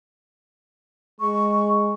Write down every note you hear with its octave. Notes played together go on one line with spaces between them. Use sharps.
G#3 C#6